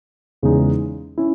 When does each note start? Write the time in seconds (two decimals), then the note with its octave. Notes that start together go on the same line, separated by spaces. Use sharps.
0.43 E2 C#3 G#3 D#4
1.18 C#4 E4